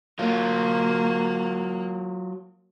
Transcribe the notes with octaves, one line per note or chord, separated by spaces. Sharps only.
F#3 A#3 F4